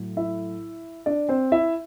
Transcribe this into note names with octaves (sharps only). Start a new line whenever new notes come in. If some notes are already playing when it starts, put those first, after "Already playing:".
Already playing: A2 F#3 A3
E4 E5
D4 D5
C4 C5
E4 E5